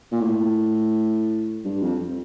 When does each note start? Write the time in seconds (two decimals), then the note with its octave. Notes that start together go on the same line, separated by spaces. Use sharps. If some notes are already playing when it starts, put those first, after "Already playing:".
0.12 A#2
0.21 A2
1.65 G2
1.82 F2